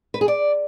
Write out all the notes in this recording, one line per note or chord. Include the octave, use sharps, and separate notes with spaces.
B4
G#4
D5